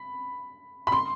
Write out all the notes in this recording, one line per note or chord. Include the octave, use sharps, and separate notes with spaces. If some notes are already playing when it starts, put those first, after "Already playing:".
Already playing: B5
B5
C6